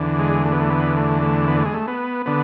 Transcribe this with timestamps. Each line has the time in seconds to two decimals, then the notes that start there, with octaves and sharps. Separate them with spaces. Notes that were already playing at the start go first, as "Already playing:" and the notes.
Already playing: E2 D3
0.19 G#3
0.45 A3
0.52 B3
0.61 A3
0.70 B3
0.97 A3
1.22 A3
1.48 B3
1.57 A3
1.65 G#3
1.74 A3
1.88 B3
2.26 D3 B3